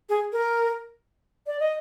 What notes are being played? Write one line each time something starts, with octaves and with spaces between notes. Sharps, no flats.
G#4
A#4
D5
D#5